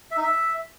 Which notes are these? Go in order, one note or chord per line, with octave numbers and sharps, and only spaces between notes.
E5
D#4
E5